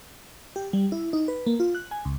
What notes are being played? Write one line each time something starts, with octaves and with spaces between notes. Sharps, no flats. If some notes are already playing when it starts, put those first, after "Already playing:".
G4
G3
E4
D#4
B4
A#3
F4
F#6
G#5
C#2